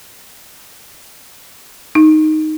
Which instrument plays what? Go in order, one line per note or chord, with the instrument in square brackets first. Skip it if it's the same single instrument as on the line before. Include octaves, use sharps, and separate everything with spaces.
[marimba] D#4